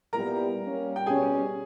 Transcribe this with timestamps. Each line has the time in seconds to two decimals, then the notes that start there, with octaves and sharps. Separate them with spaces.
0.13 A#2 G3 B3 E4 G4 A#4 A#5
0.60 G3 A#3 C#4
0.96 G5
1.06 B2 G3 C#4 G4 G#4 G#5